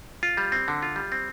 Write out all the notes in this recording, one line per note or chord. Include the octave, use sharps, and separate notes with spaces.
F4
G3
C4
D3
F4
G3
C4